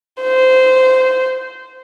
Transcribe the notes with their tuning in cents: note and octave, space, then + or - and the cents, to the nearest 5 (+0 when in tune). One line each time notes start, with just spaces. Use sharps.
C5 -15